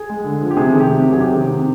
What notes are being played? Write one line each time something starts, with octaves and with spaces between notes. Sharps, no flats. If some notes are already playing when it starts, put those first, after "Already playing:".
Already playing: G#4
G#3
D3
F3
G4
C3 G#4
D#3
G4
C3
F#3 G4
G#4
C3 G4
D#3
C3